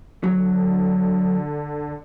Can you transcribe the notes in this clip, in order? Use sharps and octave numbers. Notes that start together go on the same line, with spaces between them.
D3 F#3